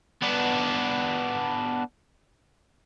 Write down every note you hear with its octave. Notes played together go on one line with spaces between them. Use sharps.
B3 D4